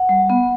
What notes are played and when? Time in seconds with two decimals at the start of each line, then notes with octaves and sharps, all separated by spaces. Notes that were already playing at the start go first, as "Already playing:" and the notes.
Already playing: F#5
0.09 G3
0.30 B3